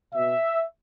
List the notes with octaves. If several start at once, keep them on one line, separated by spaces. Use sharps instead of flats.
B2 E5